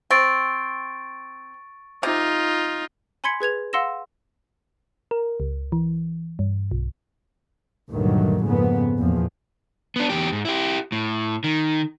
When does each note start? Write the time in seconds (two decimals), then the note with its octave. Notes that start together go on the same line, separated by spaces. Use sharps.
0.10 C4 C#6 A6 D7
2.03 C3 D#4 F4
3.24 G#5 B5 C6 G#6 B6 C#7
3.40 G#4 B4 G#6 F7
3.73 F5 F#5 C6 E6 A#6 E7
5.11 A#4
5.40 C#2
5.72 E3
6.39 G2
6.71 B1
7.91 D2 G2 A#2 D#3 F#3 A3
8.42 F2 G#2 C#3 A#3 B3
8.98 E2 A#2 F3
9.96 B3 D4
10.09 E2 G4
10.32 G#2
10.45 E4 G4
10.92 A2
11.44 D#3